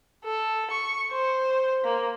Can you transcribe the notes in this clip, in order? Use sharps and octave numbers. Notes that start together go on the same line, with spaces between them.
A4
C#6
C5
A#3